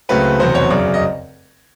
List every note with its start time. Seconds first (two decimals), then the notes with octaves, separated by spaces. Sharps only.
0.09 C#2 C#3 F#3 A3 C4 B4
0.39 F1 E2 B2 F#3 C5
0.55 C#5
0.70 F#2 C#3 F#3 D5
0.94 D#5